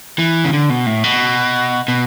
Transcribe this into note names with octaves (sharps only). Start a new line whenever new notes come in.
E3
C#3
D3
B2
A2
B2
B2